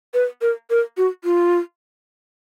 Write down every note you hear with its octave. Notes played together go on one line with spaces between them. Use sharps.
B4
A#4
A#4
F#4
F4